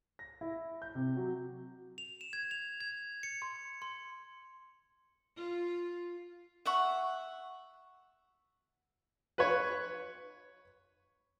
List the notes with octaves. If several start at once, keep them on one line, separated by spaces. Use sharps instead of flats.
A#6
E4
G6
C3
F#3
F7
E7
G#6
F7
G#6
C#7
C6
C6
F4
E5 F#5 C#6
B4 C#5